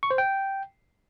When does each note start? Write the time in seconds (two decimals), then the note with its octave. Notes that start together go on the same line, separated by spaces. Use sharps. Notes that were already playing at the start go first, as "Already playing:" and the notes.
0.03 C#6
0.11 C5
0.18 G5